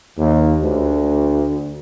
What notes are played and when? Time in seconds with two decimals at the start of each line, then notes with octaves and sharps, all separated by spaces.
0.18 D#2
0.63 D2